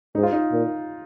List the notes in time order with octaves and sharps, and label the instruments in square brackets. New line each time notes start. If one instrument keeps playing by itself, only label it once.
[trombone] G#2 [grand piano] D#4
[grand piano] F4
D#4
[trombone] A#2